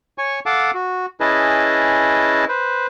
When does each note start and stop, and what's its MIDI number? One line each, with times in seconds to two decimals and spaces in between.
0.18 0.40 73
0.18 0.40 80
0.18 0.40 85
0.46 0.71 69
0.46 0.71 77
0.46 0.71 78
0.46 0.71 81
0.46 0.71 86
0.74 1.06 66
1.20 2.45 61
1.20 2.45 64
1.20 2.45 68
1.20 2.45 71
1.20 2.45 75
1.20 2.45 81
2.49 2.87 71
2.49 2.87 72